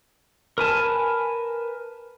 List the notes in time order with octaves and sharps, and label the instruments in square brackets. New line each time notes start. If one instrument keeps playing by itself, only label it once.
[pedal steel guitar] A#4 B4 G#5 A5